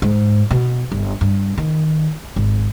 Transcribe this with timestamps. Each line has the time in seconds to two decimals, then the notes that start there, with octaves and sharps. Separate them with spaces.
0.02 G#2
0.51 B2
0.92 G1
1.21 G2
1.58 D#3
2.36 G#1